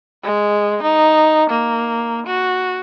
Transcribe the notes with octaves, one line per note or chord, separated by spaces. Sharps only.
G#3
D#4
A#3
F#4